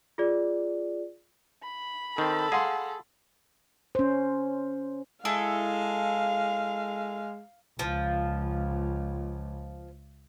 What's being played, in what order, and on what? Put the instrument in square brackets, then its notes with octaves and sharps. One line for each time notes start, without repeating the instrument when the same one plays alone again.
[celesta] F4 G#4 D5
[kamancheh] B5
[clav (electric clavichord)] D#3 C4 [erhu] A4
[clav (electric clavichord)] G#4 [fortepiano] F5 F#5 C6
[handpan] C#4 C5
[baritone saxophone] G#3 [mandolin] E4 G#4 A4 [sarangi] F5
[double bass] C#2 [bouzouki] F3